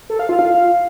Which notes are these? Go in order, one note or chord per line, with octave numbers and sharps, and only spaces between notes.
A4
F5
F4
F5